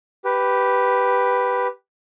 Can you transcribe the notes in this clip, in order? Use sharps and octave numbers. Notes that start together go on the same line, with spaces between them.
G4 B4